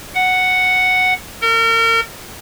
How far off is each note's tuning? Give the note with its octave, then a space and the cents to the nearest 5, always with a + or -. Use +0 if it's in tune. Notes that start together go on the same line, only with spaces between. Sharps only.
F#5 +0
A#4 -35